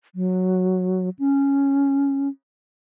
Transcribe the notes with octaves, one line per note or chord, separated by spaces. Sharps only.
F#3
C#4